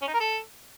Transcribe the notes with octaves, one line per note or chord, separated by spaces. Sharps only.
C#4
D#4
A#4
A4